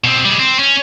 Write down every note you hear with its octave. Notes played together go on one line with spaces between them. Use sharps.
B2 C4
G3 G#3
C4
C#4